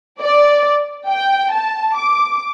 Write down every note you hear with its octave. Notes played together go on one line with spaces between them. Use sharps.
D5
G5
A5
D6